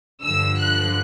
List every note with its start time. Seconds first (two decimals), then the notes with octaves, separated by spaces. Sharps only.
0.23 G2 D3 F3 E6
0.58 F#6